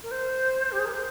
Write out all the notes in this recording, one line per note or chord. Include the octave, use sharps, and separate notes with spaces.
A#4
C5
G4
G#4
A#4
C5